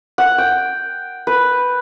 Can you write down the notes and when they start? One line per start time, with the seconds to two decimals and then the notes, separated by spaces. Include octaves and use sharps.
0.18 F#5
0.38 G5
1.27 B4